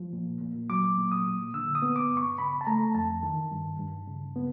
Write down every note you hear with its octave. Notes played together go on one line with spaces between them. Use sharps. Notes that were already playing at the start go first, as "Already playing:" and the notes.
Already playing: F3
A#2
A#2
F#3 D6
A#2
D#6
A#2
D3 E6
D#6
B3
D6
G2
C#6
C#3 B5
A5
A3 A#5
F2 A5
D#3
G2
G2
C#3
B3